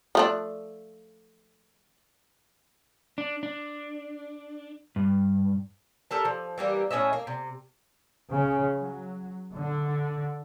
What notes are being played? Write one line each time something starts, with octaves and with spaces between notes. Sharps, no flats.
F3 A3 D4
D4
D4
G2
G4 A4 A#4 A5
F3
E3 G3 A#3 G4
A2 C#4 D#5 E5
A#3
C3
C#3
F#3
D3